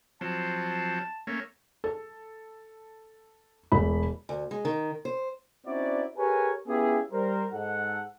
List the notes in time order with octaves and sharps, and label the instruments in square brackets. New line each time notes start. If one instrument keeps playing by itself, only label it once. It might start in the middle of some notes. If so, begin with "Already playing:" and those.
[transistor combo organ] F3 F#3 C4 [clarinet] A5
[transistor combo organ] A3 A#3 C#4
[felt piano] A4
E1 A3 B5
[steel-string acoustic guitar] D2
G#3
D#3
C5
[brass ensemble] C4 C#4 D#4 E4 F#4 D5
G4 G#4 A#4 B4 C#5 G#5
B3 C#4 E4 F4 G4 G#4
G3 A#4 C5
G#2 A4 F#5